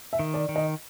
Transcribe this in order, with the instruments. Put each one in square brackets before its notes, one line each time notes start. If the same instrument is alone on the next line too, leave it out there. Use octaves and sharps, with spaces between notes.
[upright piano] E5
[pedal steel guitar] D#3
[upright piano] D5
[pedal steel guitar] D#3
[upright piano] D#5